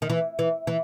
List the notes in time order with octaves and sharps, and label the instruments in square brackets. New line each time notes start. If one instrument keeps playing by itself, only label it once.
[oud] D#3
E3
E3
E3